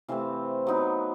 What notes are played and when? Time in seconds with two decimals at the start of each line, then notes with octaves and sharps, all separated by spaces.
0.08 C3 E3 A3 C4 F5
0.67 F#3 B3 D#4